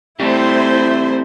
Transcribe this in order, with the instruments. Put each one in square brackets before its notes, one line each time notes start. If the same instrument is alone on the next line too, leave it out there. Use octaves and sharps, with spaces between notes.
[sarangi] A3 [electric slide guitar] C4 D4 G4 [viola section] E4 C5